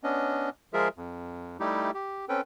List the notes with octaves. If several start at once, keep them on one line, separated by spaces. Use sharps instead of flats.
B3 C#4 D4 D#5
F3 G#3 F4 G#4 A#4 E5
F2
G3 A3 D#4 E4 G4
G4
C4 C#4 A4 B4 G5